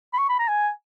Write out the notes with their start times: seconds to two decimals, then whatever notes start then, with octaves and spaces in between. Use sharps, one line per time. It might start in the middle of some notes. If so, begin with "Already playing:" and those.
0.13 B5
0.18 C#6
0.29 B5
0.39 A#5
0.48 G#5